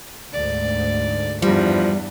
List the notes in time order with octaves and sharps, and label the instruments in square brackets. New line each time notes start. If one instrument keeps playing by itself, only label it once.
[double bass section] D2 G#2 [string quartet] D5
[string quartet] E2 G2 [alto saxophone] F3 [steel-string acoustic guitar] G3